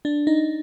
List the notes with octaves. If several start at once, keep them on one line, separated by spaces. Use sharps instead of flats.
D4
D#4